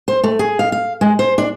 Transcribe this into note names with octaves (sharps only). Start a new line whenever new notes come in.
C5
A3
G#4
F5
F5
G#3
C5
D4